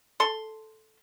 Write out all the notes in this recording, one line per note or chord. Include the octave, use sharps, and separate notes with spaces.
A4 C6